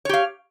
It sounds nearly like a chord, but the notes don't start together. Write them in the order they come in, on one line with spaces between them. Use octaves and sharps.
C#5 G4 F5